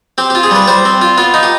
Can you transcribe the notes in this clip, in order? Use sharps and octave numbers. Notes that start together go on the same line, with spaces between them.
C4 G4
F4 G4
G#4
G3 B4
G3 C5
C4
F4
B3 F4
D#4
G4